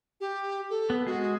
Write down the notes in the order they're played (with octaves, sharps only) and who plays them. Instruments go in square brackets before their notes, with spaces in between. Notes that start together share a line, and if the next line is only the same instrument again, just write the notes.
[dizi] G4
A4
[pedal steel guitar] B3
[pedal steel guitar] G#3 G#4 [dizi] F#4